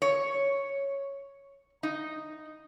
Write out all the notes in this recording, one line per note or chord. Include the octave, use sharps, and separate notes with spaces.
C#5
D#4